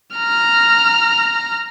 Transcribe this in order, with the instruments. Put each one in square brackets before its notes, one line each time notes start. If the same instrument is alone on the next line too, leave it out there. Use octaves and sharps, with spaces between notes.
[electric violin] A#5 F6